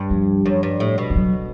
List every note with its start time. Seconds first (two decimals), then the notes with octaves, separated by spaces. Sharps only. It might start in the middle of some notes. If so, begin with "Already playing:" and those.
Already playing: G2
0.11 F3
0.46 F#2
0.63 G2
0.80 A2
0.98 B2
1.10 G3
1.16 F#3